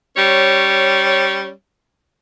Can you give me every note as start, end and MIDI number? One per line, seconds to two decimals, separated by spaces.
0.17 1.50 55
0.17 1.50 61
0.17 1.50 73